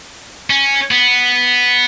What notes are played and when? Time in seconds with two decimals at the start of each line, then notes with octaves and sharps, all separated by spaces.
0.50 C#4
0.91 B3